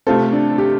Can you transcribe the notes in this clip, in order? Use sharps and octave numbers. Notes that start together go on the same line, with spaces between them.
C3 A3 C4 F4 A4
D4
G4